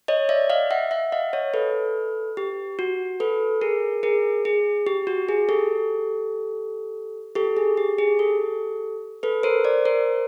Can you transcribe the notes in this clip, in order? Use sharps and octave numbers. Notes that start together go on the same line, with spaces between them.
C#5 D#5
D5 E5
D#5 F5
E5 F#5
E5 F#5
D#5 F5
C#5 D#5
A4 B4
G4
F#4
A4 B4
G#4 A#4
G#4 A#4
G#4
G4
F#4
G#4
G4 A4
G4 A4
G#4
G4
G#4
G4 A4
A4 B4
A#4 C5
C5 D5
A#4 C5